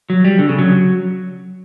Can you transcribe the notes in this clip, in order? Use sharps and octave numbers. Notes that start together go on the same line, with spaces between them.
F#3
G3
D3
C#3
F#3